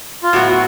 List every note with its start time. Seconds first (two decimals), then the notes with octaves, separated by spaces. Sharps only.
0.23 F4
0.33 A2 F#3 B3 F#4
0.48 F#4